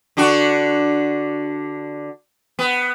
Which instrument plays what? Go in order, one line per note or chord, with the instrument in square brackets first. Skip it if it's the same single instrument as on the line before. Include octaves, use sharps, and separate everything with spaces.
[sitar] D3 D4 F#4
B3